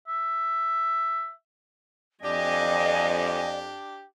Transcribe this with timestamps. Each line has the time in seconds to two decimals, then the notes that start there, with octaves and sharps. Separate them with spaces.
0.08 E5
2.24 F2 D4 G4 D5 D#5 G#5